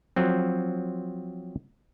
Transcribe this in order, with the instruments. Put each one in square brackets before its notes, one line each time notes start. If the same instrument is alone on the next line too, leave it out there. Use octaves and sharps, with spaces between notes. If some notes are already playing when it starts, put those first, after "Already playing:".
[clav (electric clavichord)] F3 F#3 C4